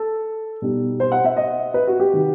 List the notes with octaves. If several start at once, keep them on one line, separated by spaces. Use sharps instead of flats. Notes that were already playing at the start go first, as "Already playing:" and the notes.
Already playing: A4
B2 G3 D#4
C5
F#5
E5
D#5
B4
F#4
G4
C3 D#3